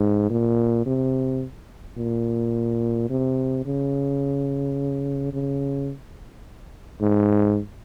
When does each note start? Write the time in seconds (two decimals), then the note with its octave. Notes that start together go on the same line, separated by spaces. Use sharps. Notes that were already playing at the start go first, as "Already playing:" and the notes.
Already playing: G#2
0.30 A#2
0.86 C3
1.97 A#2
3.10 C3
3.66 C#3
5.33 C#3
7.01 G#2